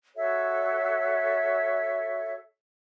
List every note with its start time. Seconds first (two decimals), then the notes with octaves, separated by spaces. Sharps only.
0.16 F#4 A4 C#5 E5